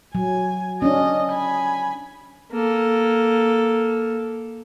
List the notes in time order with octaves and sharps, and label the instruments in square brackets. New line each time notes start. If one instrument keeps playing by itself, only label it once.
[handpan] F#3 [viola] G#5
[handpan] C#4 D4 [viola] D#5
[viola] G#5 B5
[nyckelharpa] A#3 A4